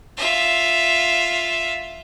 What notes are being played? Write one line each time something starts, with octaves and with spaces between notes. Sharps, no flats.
F4 E5